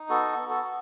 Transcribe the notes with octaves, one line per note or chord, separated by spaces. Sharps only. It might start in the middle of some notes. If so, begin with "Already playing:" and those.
Already playing: D#4
B3 F#4 A4
B3
F#4 A4
F#4